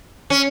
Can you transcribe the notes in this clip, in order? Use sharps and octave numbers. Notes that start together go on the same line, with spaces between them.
C#4